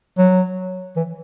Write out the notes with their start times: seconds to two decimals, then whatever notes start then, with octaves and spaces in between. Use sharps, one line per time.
0.18 F#3
0.96 E3